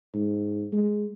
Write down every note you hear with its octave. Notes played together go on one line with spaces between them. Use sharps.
G#2
G#3